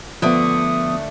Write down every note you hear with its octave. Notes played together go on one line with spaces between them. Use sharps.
D3 F3 A3 B3 D#6